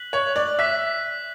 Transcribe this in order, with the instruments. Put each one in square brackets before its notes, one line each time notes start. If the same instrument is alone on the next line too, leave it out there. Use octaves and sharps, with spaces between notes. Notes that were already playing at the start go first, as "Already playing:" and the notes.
Already playing: [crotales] F#6 B6 F#7
[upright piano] C#5
D5
[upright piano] E5 [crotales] F#6 B6